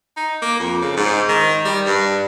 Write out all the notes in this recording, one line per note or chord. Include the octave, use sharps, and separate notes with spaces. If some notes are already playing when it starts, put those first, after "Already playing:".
D#4
A#3
F2
C#3
G#2
D#3
G3
G2